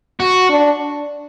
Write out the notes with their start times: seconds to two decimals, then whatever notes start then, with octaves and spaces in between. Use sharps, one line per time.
0.20 F#4
0.50 D4